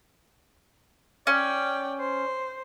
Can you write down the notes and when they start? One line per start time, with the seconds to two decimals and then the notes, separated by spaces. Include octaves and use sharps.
1.27 C#4 D5 G5
2.00 C5